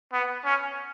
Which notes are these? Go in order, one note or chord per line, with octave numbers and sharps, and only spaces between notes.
B3
C#4